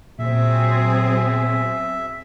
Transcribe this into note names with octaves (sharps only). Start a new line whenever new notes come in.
A#2 F#3 C4 G#4 E5